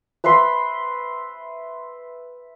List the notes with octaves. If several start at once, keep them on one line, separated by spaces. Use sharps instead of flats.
B4 E5 B5 C6